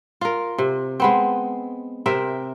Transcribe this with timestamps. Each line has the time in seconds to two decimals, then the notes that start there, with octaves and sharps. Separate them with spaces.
0.21 F4 A#4
0.58 C3
1.00 G#3 B3 C4
2.06 C3 C4 A#4 E5